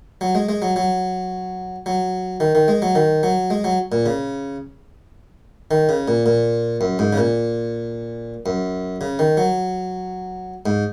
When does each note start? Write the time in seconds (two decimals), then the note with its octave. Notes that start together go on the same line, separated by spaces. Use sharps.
0.21 F#3
0.35 G#3
0.49 G#3
0.62 F#3
0.76 F#3
1.86 F#3
2.40 D#3
2.55 D#3
2.68 G#3
2.82 F#3
2.95 D#3
3.23 F#3
3.50 G#3
3.64 F#3
3.92 A#2
4.06 C#3
5.71 D#3
5.89 C#3
6.08 A#2
6.26 A#2
6.81 F#2
6.99 G#2
7.13 C#3
7.18 A#2
8.46 F#2
9.01 C#3
9.19 D#3
9.37 F#3
10.66 G#2